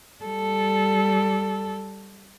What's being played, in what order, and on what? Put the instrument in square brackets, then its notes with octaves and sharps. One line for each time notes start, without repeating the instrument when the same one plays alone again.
[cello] G3 A4